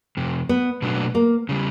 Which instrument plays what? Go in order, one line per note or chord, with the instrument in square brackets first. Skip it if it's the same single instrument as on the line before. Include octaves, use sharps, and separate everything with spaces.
[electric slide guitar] F2 C3
[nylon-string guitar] B3
[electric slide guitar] B2 F#3 A3 D4 F#4
[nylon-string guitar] A#3
[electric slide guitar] C#3 G3